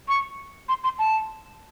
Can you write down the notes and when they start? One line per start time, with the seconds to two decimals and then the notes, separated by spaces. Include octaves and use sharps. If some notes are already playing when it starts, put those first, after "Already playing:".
0.08 C#6
0.69 C6
0.84 C6
0.99 A5